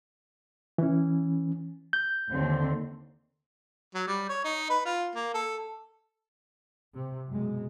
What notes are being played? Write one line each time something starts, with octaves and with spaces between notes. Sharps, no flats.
E3 C#4
G6
D#2 D3 C4
F#3
G3
C#5
D#4
B4
F4
A#3
A4
C3
F#2 B2 G#3